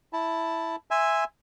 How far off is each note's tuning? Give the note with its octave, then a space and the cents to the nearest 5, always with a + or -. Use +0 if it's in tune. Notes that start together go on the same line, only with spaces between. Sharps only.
E4 +0 A5 +0
E5 +0 G#5 -10 C6 -5